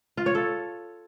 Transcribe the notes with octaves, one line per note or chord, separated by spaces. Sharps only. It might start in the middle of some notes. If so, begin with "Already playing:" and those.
F4
C#5
A4